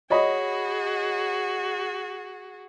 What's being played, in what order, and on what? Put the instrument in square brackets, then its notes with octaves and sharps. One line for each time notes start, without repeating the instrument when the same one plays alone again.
[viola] F#4 G#4 [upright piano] C#5 D#5 B5